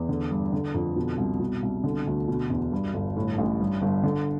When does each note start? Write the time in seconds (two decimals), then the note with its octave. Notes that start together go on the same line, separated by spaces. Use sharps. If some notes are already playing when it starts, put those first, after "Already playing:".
Already playing: E2
0.09 D3
0.31 G2
0.53 D3
0.74 F2
0.96 B2
1.18 C2
1.40 B2
1.63 C2
1.84 D3
2.07 D2
2.28 B2
2.50 E2
2.72 G2
2.94 G1
3.16 A2
3.38 A1
3.60 G2
3.82 G1
4.04 D3